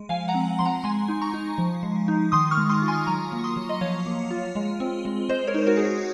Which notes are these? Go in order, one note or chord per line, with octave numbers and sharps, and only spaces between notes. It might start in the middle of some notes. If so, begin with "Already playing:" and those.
Already playing: G#3
F3 F5 G#5
F#5 A#5
C4
F3 C6
F#5 A#5
G#3 G#5 C6
D#4
A#5 C#6
D#4
F3
G#3
D#4
D#3 C6 D#6
C#6 F6
G#3
C6 D#6
F4
G#5 C6
F#3 A#5 C#6
A#3
C#6
C6 D#6
F#3
D#5
F3 C#5 F5
A#3
F4
G#3
C4
G#3
G#3 C5 D#5
A#4 C#5
D#4 C5
F#4 A#4
D#4 G#4
F#4